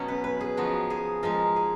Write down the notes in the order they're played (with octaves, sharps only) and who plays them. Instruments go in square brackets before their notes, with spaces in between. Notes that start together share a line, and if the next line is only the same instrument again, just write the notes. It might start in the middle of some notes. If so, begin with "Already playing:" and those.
Already playing: [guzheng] B2 F#3 B3 C#4 D#4 C#5 D#5
B4
B4
G#4
F3 B3 D#4 F#4
G#4
F3 G#3 D#4 A#4
G#4